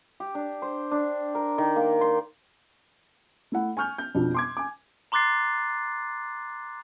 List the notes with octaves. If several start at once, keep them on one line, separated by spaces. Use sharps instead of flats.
G4
D4
C5
D4
A#4
D#3
A#3
C6
A3 E4 F#5
G#5 C#6 F6 G6
G6
F2 B2 D4
C6 D6 G#6
G#5 D6
A#5 C6 D6 F#6 A6 C7